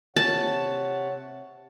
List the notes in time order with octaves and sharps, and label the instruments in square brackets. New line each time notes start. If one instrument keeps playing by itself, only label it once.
[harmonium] C3 C#5 F#5 [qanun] A5